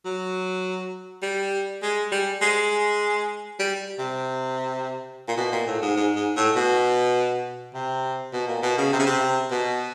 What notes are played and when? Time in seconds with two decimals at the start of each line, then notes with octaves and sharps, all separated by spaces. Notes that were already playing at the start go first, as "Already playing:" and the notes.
0.05 F#3
1.22 G3
1.82 G#3
2.12 G3
2.41 G#3
3.59 G3
3.99 C3
5.28 A#2
5.37 B2
5.52 A#2
5.67 A2
5.82 G#2
5.96 G#2
6.16 G#2
6.36 A2
6.55 B2
7.74 C3
8.33 B2
8.48 A#2
8.63 B2
8.78 C#3
8.93 C3
8.99 C#3
9.06 C3
9.51 B2